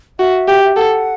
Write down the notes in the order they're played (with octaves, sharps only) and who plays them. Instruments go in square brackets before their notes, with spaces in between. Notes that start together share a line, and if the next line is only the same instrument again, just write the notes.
[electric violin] F#4 [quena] E5
[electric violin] G4
[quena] E5
[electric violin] A4 [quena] F#5